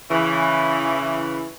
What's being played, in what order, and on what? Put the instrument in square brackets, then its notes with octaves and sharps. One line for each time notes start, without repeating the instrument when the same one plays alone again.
[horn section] C#3 E3